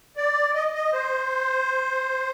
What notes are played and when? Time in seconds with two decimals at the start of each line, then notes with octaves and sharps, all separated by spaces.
0.17 D5
0.55 D#5
0.74 D#5
0.93 C5